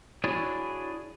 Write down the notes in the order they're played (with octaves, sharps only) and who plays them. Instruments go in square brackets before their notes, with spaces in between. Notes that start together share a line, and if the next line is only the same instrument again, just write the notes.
[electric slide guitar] D4 E4 F#4 G#4 C#5 D5